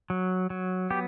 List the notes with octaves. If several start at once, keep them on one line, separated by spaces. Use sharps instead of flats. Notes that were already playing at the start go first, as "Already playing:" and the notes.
F#3
F#3
B3 G4